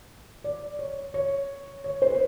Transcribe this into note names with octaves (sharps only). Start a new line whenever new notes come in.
D5
C#5
C#5
C#5
C5
B4